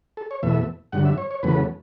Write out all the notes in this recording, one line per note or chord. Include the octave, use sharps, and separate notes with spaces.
A4
C#5
E2 B2 A3 E5
G2 D3 F#3 F#5
E5
C#5
C#5
E2 C#3 F#3 A3 B4